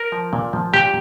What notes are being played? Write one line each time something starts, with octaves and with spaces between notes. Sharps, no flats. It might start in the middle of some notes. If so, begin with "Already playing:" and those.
Already playing: A#4
F3
A#2
F3
A#2 G4